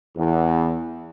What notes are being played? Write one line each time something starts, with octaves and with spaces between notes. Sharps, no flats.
E2